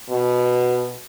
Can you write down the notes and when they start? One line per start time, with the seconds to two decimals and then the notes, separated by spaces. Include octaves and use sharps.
0.10 B2